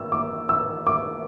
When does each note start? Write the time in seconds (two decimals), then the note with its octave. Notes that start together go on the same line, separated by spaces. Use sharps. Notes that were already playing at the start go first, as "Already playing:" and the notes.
Already playing: E6
0.12 D6
0.49 E6
0.87 D6